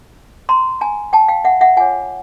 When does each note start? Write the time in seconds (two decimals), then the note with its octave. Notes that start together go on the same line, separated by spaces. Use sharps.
0.49 A#5 C6
0.81 G#5 A#5
1.13 G5 A5
1.28 F5 G5
1.44 E5 F#5
1.61 E5 F#5
1.77 F4 G#4 C#5 F#5 G#5